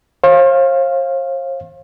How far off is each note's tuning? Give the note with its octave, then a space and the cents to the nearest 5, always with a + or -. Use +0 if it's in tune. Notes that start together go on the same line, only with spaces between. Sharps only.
C5 +45 F5 +0